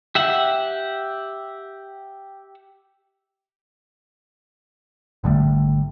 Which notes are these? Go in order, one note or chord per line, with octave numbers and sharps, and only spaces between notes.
G4 E5 F#5
G#1 D3 G3 A3